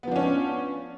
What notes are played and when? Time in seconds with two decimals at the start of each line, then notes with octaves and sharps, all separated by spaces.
0.03 B3
0.07 F3
0.12 D4
0.16 C#4